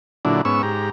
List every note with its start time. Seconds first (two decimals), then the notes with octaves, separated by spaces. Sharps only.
0.25 A#2 D3 F#3 D4 E4
0.45 G#2 B3 C#4 C#6 E6
0.63 G#2 G4 A#5